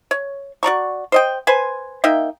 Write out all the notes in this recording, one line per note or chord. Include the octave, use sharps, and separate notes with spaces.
C#5
F#4 D5 A#5 C#6
C5 D#5 G5
B4 C5 G#5
A#3 D#4 E5 G5